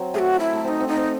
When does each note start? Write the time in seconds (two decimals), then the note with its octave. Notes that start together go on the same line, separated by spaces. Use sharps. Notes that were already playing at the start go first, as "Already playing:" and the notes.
Already playing: F#3 C4
0.14 A3 G#4
0.18 F#4
0.39 E4
0.54 A3
0.63 C4 D#4 E4
0.80 C4
0.88 D#4
0.96 C4